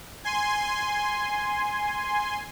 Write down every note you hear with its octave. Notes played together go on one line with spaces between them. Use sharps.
G#5 C6